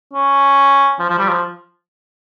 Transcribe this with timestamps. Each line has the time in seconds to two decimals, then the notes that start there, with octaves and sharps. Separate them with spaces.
0.13 C#4
0.99 F3
1.10 F3
1.19 G3
1.29 F3